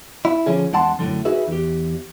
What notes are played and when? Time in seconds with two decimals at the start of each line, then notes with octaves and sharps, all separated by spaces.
0.25 E4
0.46 D3 F3 C#4 G#4
0.73 E2 G#3 D4 F#5 A5 C6
0.99 F#2 A2 D3 F3
1.25 D#4 F#4 G#4 B4 E5
1.48 E2 G4